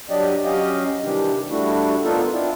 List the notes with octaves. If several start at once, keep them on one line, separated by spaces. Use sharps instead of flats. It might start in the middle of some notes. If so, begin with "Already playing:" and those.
F#3 D4 G4 D5 D#5
F#3 C#4 G4 D#5 F5
C3 D#3 E3 G3 D4 G4
G3 A3 D4 E4 F#4
B3 D4 D#4 F4 A4 A#4
C4 D4 E4 F4